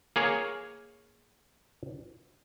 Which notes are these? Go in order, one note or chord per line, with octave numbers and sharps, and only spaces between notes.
A#3 G#4 C#5 G#5